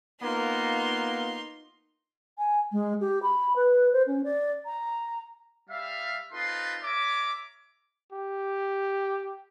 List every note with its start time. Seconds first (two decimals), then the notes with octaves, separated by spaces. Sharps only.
0.21 A#3 B3 D#4 F4 C6
2.37 G#5
2.71 G#3
3.00 G4
3.22 B5
3.55 B4
3.92 C5
4.06 C#4
4.23 D5
4.65 A#5
5.70 G3 E5 F5
6.33 C4 D#4 F4 A4 B4 C6
6.83 A#4 C#5 E5 D6
8.12 G4